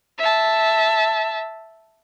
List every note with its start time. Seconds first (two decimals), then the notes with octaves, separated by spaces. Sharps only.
0.19 E5 A5